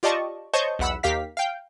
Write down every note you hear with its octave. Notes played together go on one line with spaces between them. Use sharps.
F4 G4 D5 D#5 A5 C#6
C5 C#5 D#5 A5 C#6 G6
B1 E2 F#5 B5 E6
D#2 G4 A#4 F5 B6
F5 G5